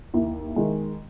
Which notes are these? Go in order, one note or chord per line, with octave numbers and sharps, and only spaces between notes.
D#2 E4
D#3 G#3